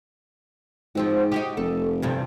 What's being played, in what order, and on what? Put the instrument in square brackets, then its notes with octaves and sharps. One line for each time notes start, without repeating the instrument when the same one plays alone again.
[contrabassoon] G#2 [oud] F3 C4 F#4
[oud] D#4 F#4 G4
[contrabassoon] F1 [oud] A4
[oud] E2 G2 C3